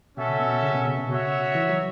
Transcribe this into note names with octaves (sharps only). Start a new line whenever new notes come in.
B2 C#4 F#4 A4 E5
C#3
B2
C#3
B2
C#3
B2
C#3 F#4 C#5 E5
E3
F#3